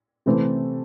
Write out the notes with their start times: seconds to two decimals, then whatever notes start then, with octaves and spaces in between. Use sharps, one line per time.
0.26 C3 E3 A3 C4